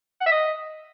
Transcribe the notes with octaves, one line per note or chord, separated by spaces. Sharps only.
F#5
E5
D#5